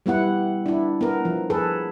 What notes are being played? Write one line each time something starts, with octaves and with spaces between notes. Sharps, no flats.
G3 B3 E4 F#5
D4 E4
B3 A#4
F3
G#4 A4 B4